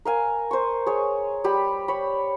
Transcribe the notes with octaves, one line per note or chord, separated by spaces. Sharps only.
A#4 F5 G#5
C5 C#6
G#4 C#5
G3 G4 B5
C#5 B5